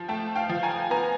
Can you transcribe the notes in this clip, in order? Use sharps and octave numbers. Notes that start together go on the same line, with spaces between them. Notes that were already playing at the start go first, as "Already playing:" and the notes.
Already playing: F3
A3 G5 A5
F5 G5
F3
G#5 A#5
B3 G#5 A#5